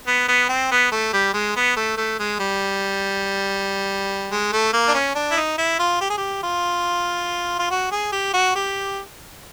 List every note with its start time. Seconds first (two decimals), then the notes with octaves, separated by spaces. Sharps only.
0.07 B3
0.28 B3
0.49 C4
0.71 B3
0.92 A3
1.13 G3
1.34 G#3
1.56 B3
1.76 A3
1.97 A3
2.19 G#3
2.40 G3
4.31 G#3
4.52 A3
4.73 A#3
4.88 D4
4.94 C#4
5.15 D4
5.31 E4
5.37 D#4
5.58 E4
5.79 F4
6.01 G4
6.10 G#4
6.17 G4
6.43 F4
7.59 F4
7.71 F#4
7.91 G#4
8.12 G4
8.34 F#4
8.55 G4